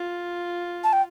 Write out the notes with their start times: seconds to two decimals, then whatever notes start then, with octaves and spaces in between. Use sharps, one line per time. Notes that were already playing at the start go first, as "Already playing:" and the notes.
Already playing: F4
0.84 A5
0.93 G5